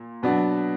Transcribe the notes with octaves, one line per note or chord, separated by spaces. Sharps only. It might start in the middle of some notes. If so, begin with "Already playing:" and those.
Already playing: A#2
B2 F#3 B3 D4